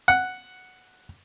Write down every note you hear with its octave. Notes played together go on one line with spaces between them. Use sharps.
F#5